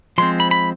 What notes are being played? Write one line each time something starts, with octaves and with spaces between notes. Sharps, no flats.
F3 G#3 C4 C6
B5
B5